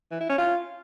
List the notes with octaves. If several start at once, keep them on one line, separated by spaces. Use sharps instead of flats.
E3
E4
C#4
F4